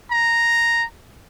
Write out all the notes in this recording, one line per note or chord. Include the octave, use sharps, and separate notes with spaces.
A#5